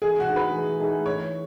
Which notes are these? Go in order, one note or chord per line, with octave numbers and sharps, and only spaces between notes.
E3 G#4
F#4
A3 D#4 G#4
B4
E3
A3 D#4 G#4
E3 C#5